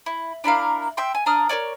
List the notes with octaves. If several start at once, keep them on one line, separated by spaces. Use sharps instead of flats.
E4
D4 E4 A#4 F5
E5 G5 C6
G#5
D4 A#5 D#6 F6
A#4 B4 C#5 D5